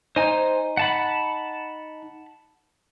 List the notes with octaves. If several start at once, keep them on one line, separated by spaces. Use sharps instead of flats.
D#4 C5 G#5
F#5 A5 B5